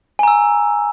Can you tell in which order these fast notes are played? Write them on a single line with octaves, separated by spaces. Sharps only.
G#5 A#5 E6